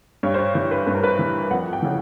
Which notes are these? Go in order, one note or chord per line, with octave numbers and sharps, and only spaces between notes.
G2 C#5
C5
C#5
E3 C#5
B4
G2 B4
A#4
B4
E3
F2 F#5
G5
C#3 E3